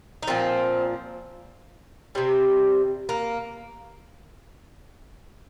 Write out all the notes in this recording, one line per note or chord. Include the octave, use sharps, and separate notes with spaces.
D#4
A#2 F3 C4
C3 G3 C4
A#3